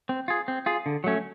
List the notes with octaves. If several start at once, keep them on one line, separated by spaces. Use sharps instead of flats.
C4
F4 G#4
C4
F4 G#4
D3
F#3 A3 C#4